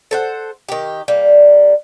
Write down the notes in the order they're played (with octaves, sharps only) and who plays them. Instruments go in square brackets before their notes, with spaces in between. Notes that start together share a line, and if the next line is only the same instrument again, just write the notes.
[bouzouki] A4 C5 F#5
D#3 G4
G3 A#3